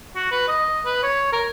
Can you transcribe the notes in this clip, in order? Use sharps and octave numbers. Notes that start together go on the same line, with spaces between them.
F#4
B4
D#5
B4
C#5
A#4